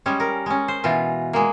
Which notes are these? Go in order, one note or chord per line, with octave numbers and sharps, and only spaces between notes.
G3 G#3 C#4
A#4
G#3 C#4
C5
B2 E3 F4
G#3 A#3